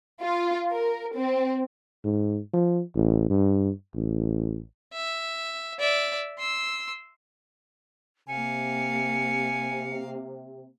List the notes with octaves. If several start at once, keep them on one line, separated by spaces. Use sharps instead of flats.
F4
A#4
C4
G#2
F3
A1
G2
A1
E5
D5 E5
C6 E6
C3 A#3 F5 G#5 C#7